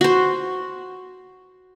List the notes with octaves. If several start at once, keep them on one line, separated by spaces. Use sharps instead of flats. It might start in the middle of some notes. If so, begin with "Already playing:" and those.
F#4 C5